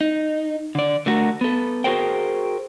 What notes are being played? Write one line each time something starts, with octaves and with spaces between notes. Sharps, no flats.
D#4
D3 D5
D3 A3 F#4 G#4 A#4
B3 A4
F#4 G#4 A#4 C5 G5